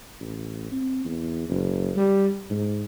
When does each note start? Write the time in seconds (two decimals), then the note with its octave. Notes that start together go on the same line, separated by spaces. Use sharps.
0.20 A1
0.72 C4
1.05 E2
1.49 F#1
1.96 G3
2.50 G#2